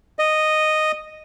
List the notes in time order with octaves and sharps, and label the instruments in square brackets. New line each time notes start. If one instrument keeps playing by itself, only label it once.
[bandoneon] D#5